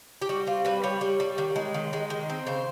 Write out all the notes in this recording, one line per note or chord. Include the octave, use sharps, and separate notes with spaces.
G4
G3 F#4
C4 F4
G3 B4
G3 C#5
G3
G3
D#3
G#3
D#3
G#3
D#3
C4
C#3 C5